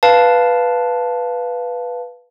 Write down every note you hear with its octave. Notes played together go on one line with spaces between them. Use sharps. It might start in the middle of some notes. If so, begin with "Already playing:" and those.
B4 F5 A5